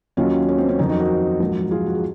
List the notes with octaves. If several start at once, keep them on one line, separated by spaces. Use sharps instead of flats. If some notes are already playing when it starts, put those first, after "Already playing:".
D#2 D#3 F#3 C#4 F4
C#4
C4
C#4
F2 D#3 F#3 C4 D#4
D#4 F#4
F#4 A#4
A#1 G#2 F#3
F4 G#4
F#4
G#4